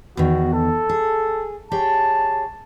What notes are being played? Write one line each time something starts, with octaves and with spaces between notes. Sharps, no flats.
E2 D#3 F#4
A4
G#4
G4 G#4 C#5 A5